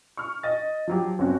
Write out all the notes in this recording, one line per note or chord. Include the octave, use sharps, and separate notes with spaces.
C#6 F6
D#5 A6
F3 F#3 G4
G1 C4 C#4 F#4